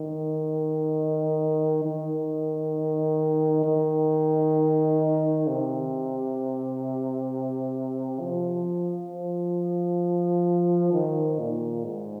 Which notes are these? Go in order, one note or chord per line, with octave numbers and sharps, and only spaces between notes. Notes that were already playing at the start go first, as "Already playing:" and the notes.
Already playing: D#3
D#3
D#3
C3
F3
F3
D#3
A#2
G#2